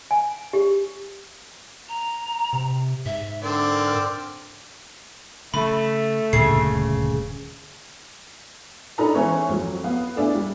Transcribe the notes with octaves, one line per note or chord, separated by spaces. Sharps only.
G#5
G4
A#5
C3
G#2 E5
D3 C4 A#4 D5
C#3 A3 B5
D#1 D2 G2 C#3 C7
D4 D#4 A4 A#4 A#5 B5
E3 G#3 C#4 E4 C5 C#5
F2 F#3
B3 F5
A3 D4 E4 G#4
G3